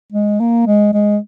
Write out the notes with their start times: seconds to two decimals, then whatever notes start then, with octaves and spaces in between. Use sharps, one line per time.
0.12 G#3
0.40 A#3
0.67 G#3
0.93 G#3